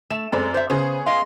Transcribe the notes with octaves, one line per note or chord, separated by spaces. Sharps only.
A3 E7
F#2 G#3 C4 A4 D5
C5 E5
C#3 B3 C#4 G#4 C5
D#5 F5 C6